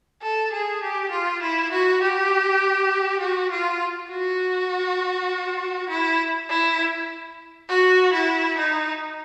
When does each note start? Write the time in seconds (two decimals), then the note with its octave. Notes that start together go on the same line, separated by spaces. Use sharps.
0.22 A4
0.52 G#4
0.83 G4
1.11 F4
1.42 E4
1.72 F#4
2.02 G4
3.20 F#4
3.51 F4
4.11 F#4
5.89 E4
6.50 E4
7.69 F#4
8.13 E4
8.58 D#4